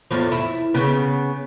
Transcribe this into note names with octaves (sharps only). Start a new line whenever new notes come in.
E2 A2 F3
E4
C#3 B3